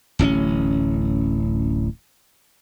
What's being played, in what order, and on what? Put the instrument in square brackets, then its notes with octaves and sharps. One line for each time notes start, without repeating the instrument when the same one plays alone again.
[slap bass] D1 A1 C4 C#4